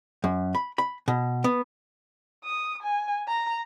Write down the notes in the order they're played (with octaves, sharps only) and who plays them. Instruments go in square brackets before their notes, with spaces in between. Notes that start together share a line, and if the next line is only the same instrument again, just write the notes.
[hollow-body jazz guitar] F#2
B5
B5
B2
B3
[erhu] D#6
G#5
A#5